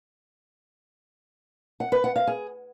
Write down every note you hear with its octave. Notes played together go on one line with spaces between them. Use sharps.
F#5
B4
F#5
F5
G#4